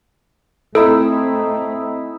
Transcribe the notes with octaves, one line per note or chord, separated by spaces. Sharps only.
A3 C4 D#4 E4 A4 E5